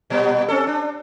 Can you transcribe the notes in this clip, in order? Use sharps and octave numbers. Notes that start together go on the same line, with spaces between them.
A#2 G3 B3
C4 C#4 A4
D4